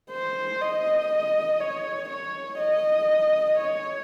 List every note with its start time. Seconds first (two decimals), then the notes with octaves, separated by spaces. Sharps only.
0.11 C5
0.61 D#5
1.60 C#5
2.09 C#5
2.58 D#5
3.58 C#5